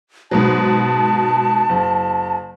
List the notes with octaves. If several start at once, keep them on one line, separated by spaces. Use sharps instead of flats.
G#2 B2 F#3 A5
F#1